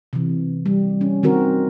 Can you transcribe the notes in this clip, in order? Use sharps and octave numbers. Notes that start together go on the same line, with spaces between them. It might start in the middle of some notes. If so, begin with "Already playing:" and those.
C3 E3
G3
C#4
D#3 C4 F#4 A#4